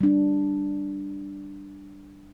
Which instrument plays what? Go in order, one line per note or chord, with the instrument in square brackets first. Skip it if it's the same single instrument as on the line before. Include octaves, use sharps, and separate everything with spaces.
[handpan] G3 D4